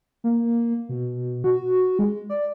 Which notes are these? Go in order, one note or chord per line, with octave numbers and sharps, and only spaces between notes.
A#3
B2
F#4
G#3
D5